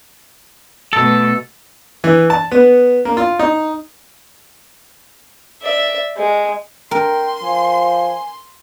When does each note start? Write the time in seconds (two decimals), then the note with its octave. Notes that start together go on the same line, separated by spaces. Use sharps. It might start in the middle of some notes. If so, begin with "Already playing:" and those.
0.93 B2 A3 A4
2.04 E3
2.30 A5
2.52 B3
3.05 A#3
3.17 F4
3.39 D#4
5.62 D5 E5
6.17 G#3
6.91 A#4 G5 C6
7.43 F3 G#5